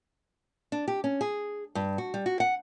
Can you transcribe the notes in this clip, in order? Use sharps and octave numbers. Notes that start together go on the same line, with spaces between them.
D4
G4
C#4
G#4
G2
F#4
G3
F#4
F#5